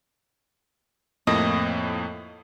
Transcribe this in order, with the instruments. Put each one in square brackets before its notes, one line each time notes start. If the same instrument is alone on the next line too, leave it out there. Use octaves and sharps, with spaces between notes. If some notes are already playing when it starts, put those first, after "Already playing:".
[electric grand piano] F2 A2 A#3 [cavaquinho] D#5